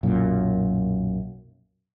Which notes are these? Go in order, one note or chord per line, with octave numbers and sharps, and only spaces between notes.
B1 F#2 A#2